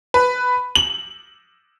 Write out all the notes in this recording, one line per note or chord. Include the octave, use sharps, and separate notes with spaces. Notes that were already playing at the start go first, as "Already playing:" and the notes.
B4
F#7